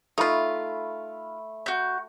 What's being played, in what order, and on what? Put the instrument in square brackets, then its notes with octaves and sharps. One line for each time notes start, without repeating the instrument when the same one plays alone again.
[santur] A3 B5 [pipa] D#4 F4
[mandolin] F#4 G6